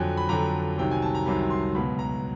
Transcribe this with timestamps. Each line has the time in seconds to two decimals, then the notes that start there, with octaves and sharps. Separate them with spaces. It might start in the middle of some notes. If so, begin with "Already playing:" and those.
Already playing: F2 D3 F#3 G#5
0.17 B5
0.29 F2 D3 F#3 A#5
0.77 C2 C3 D#3 F#3 G5
0.91 G#5
1.02 A5
1.15 A#5
1.26 C2 C3 D#3 F#3 B5
1.50 C6
1.74 C#2 B2 F#3 B5
1.99 A#5